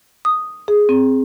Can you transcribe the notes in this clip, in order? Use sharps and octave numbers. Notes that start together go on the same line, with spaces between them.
D#6
G#4
C4